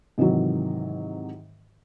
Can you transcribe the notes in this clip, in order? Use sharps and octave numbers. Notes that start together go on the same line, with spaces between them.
G#2 C3 D#3 E3 F#3